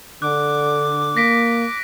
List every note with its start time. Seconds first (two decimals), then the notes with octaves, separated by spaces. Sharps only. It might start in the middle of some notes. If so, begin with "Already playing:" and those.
0.22 D3 D6 F#6
1.17 A#3 A#6 B6 D7